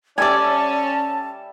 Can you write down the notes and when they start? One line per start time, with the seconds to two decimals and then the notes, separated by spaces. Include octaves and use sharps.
0.18 G3 C#4 A4 D5 E5 G#5 A5